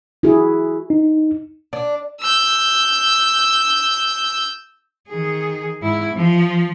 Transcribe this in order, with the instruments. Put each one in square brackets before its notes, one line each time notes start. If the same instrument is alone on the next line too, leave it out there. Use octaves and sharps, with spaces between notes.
[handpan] E4 F#4 G#4
[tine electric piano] D#4
[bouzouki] D4
[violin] E6 G6
[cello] D#3 G#4
G#2 E4
F3